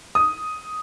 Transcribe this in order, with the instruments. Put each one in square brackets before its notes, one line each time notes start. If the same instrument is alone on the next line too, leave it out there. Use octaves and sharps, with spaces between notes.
[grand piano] D#6